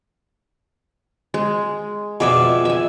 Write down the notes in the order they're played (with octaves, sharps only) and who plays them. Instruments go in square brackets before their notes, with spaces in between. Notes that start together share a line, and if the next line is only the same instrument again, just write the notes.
[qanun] G#3
[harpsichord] F2 B2 [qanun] G#4 D5 E5
[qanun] E5 G#5